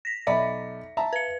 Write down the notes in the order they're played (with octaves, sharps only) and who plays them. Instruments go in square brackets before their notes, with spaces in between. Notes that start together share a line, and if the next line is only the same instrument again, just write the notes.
[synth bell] A#6 B6
[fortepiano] B1 D5 B5 [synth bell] E5
[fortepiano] E5 A5 A#5
[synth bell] B4 C#7